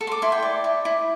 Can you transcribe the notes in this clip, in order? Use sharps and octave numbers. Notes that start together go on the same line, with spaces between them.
A4
C6
D6
E4 C6
G5
D5
E4
E4